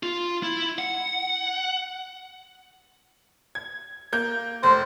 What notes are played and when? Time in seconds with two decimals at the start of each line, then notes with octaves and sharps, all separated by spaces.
0.03 F4
0.43 E4
0.79 F#5
3.55 G#6
4.13 A#3 G6
4.63 F1 C5